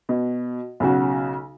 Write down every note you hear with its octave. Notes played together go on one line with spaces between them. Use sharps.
B2
B1 C#3 F#4